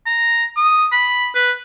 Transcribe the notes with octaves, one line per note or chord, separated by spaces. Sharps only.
A#5
D#6
B5
B4